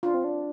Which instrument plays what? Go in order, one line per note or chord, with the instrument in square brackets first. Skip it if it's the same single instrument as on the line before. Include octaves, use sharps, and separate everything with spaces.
[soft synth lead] D4 [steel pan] F4
[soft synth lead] C4
D4